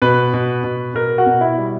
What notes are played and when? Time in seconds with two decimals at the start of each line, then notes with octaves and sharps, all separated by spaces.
0.02 B2 B4
0.34 B2
0.64 B2
0.94 B2 A#4
1.18 F#4
1.27 B2
1.41 E4
1.57 G3